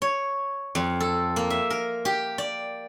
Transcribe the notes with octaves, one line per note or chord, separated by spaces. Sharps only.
C#5
F2
A4
A#3
E5
A#4
G4
D5